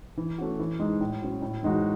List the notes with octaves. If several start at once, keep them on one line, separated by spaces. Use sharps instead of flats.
E3
A3 C#4 F#4
E3
G#3 D#4
A2
F#3 C#4
A2
E3 G#3 D#4 F#4